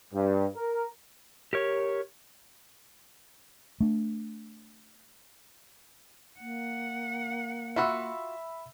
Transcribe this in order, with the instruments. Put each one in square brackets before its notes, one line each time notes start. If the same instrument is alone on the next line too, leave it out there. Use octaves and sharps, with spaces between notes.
[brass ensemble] G2
A#4
[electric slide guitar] G4 A#4 C#5
[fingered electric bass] A3 D4
[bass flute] A#3 [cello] F#5
[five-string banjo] F4 F#4 [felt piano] E5 B5 E6